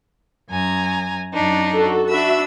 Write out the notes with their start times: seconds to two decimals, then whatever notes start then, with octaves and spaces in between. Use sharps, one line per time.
0.49 F#2 G#5 A#5
1.33 F#2 D4 D#4
1.73 F#4 A4
2.09 D4 F#4 E5 B5 E6